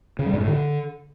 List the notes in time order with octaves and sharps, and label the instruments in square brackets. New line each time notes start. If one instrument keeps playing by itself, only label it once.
[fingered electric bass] C#3
G3
G#2
A2
D3